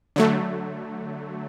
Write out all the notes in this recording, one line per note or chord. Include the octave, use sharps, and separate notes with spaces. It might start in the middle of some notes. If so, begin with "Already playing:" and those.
D3 F#3 A3